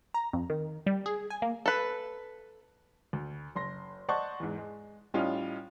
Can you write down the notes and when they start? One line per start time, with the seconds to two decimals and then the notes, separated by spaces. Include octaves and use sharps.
0.14 A#5
0.33 F2
0.50 D#3
0.87 G3
1.06 G#4
1.30 G#5
1.42 A#3
1.66 A4 B4
3.13 D2
3.55 F#1 C6 A#6
4.09 C5 D5 D#5 F#5 A5 C#6
4.40 E2 G#2
4.58 G#3
5.14 A2 G3 C#4 D#4 F4